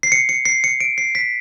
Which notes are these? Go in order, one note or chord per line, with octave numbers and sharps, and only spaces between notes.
C7
C#7
C#7
C7
C#7
D7
C7
B6